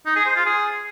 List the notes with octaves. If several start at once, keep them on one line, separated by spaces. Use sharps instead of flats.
D#4
G#4
C5
F4
G#4